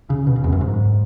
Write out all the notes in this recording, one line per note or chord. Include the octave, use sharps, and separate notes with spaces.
C#3
B2
C#3
E2
F#2
G#2